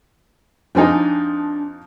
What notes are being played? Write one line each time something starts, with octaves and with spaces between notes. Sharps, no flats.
F2 F3 D4 D#4 G5 G#5